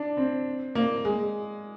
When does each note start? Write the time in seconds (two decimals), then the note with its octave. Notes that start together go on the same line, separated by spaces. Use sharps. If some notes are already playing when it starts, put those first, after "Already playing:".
Already playing: D4
0.17 C4
0.75 A#3
1.05 G#3